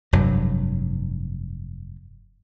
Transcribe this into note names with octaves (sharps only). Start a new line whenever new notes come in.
F1 G2 F#3